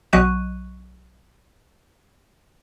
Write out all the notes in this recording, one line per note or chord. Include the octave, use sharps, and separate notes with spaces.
B1 F#3 D#5 C#6 F#6 D#7